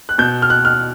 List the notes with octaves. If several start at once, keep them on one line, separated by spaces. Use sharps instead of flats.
F#6
B2 G6
F6
F#6
F6